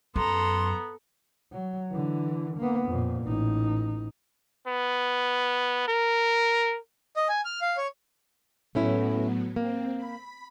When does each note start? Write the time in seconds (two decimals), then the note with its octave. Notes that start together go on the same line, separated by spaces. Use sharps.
0.16 F#2 B3 A4 A#5 C6
1.52 F#3
1.91 D3 E3
2.57 A#3 B3
2.89 F2 A#2
3.24 A1 D#4
4.67 B3
5.88 A#4
7.16 D#5
7.29 G#5
7.45 F6
7.62 F5
7.77 C#5
8.75 A2 F#3 A3 B3 C#4 E4
9.56 A#3 C4
9.96 B5